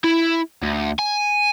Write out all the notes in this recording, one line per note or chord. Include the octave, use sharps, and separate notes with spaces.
E4
D2
G#5